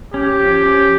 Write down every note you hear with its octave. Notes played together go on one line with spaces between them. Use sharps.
C#4 G4
F3
C#4